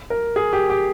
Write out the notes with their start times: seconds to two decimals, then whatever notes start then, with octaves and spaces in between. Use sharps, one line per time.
0.10 A#4
0.36 G#4
0.53 G4
0.70 G4